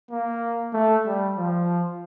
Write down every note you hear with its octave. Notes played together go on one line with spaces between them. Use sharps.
A#3
A3
G3
F3